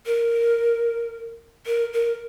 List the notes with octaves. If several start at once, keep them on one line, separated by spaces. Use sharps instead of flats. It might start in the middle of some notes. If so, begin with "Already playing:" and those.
A#4
A#4
A#4